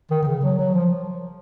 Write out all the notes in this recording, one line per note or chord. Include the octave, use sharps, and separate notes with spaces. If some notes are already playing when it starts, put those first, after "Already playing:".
D#3
D#3
C#3
F#3
F#3
F3